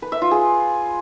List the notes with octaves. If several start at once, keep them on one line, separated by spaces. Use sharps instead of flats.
B4
E5
F4
G#4